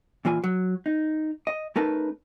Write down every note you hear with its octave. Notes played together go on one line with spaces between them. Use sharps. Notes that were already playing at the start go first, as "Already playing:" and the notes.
A#2 E3 F4 G#5
F#3
D#4
D#5
A3 C#4 D#4 A#4 B4 A5